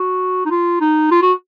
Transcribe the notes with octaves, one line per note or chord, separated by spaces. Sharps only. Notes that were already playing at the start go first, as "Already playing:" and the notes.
Already playing: F#4
D#4
F4
D#4
F4
F#4